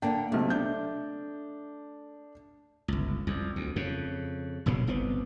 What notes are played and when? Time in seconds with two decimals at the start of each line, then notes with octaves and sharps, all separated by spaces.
0.02 D3 A#3 D4 G5 A5
0.32 B1 C3 A3
0.50 D4 G6
2.88 G1 C#2
3.27 C2 F2
3.56 D2
3.76 F2 C#3
4.66 F#1 B1 A#2 C#3
4.87 G1 C2 B3 C4